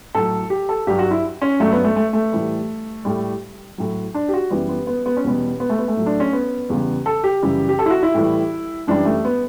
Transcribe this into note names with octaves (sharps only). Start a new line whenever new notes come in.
A2 F#3 A4
G4
A4
G2 F#3 G4
F#4
E4
C#4
G2 F#3 A3
B3
A3
A3
A3
A2 E3 G3
A2 G3
A2 F#3
D4
G4
F#4
F#2 E3 G3 B3
B3
B3
B3
C#4
E2 B2 G3 B3
B3
A3
B3
A3
A2 F#3
D4
C#4
B3
E2 C#3 G3
A4
G4
F#2 C#3 E3 G3
G4
A4
E4
F#4
E4
A2 E3 G3
F#2 E3 G3 D4
A3
B3